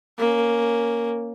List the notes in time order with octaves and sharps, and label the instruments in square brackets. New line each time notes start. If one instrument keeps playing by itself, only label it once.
[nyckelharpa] A#3 C#4